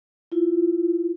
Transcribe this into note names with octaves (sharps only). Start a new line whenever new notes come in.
E4 F4